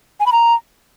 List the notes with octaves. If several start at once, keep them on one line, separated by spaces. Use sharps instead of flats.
G#5
B5
A#5